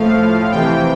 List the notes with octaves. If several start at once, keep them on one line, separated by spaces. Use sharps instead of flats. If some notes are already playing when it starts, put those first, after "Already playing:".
Already playing: A2 F3 A3 F5
F2 C3 E3 G5